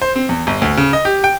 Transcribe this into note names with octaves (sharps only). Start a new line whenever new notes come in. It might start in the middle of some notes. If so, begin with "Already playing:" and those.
C5
C4
E2
G1
D2
C#3
D#5
G4
G5